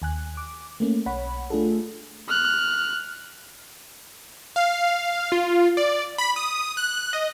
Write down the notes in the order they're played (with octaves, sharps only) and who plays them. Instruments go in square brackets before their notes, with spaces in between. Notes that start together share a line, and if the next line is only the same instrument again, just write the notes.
[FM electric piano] D#2 G#5 F#6
D6
A3 A#3 C#4
B1 C#5 F#5 B5
A3 D4 F4 G#4 A4
[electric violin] F6 F#6
[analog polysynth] F5
F4
D5
B5
D#6
F#6
D#5